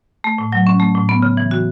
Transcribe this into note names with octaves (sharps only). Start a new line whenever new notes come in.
A3
A2
F#3
C#4
A3
A2
B3
C#3
E3
F#4